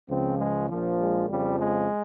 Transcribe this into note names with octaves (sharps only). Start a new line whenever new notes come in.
C#2 C#3 F3 C4
G#3
A#1 A#2 F3
G#3
F2 C#3 F3 G3
G#3